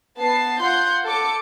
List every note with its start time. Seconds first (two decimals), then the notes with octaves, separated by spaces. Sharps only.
0.20 B3 A5 C7
0.61 F4 F#5 C6 G6
1.05 A4 D6 C#7